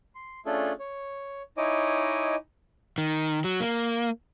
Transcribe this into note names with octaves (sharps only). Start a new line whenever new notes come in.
C6
A3 C#4 D4 F4 G#4 A4
C#5
D#4 E4 C#5 D#5 G#5 D6
D#3
F#3
A#3